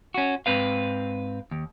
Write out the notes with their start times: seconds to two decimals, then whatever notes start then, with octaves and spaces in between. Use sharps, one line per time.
0.14 C#4 F#4
0.46 G#2 C4 B4 F5
1.51 D#2